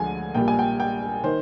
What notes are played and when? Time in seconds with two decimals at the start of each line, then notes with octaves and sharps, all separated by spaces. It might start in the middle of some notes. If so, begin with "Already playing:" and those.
Already playing: D2 D3 F3 G#3 G#5
0.35 A#1 A#2 G3 G5
0.48 G#5
0.59 G5
0.80 G5
1.23 D#3 C5